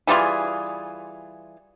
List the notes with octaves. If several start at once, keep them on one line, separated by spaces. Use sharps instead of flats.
E3 G3 F4 G#4